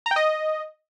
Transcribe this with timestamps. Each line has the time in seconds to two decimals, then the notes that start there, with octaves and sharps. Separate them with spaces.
0.06 A#5
0.11 G5
0.16 D#5